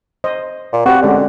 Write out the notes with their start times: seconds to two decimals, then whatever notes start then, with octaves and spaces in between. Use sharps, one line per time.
0.24 C5 D#5
0.73 A#2
0.86 C4 F#4 G4 B4
1.02 D3 G#3 C#4 G4